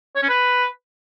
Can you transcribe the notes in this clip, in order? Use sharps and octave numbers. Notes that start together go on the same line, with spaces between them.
C#5
C#4
B4